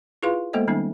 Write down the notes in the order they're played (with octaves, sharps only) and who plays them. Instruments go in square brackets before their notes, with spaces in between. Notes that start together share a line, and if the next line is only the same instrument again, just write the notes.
[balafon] E4 F4 G#4 B4 F5 C6
G#3 A#3 B3 A4 C5 D#5
D#3 G3 B3 C#4 D#4